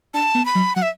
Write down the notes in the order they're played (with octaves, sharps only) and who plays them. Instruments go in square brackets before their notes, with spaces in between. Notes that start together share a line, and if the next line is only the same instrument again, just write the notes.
[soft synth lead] D4 [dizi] A5
[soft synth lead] B3
[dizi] B5
[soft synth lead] F#3
[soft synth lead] F#3 [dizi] F#5
[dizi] E5